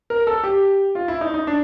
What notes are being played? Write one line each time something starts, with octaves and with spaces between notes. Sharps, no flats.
A#4
A4
G4
F4
E4
D#4
D#4
D4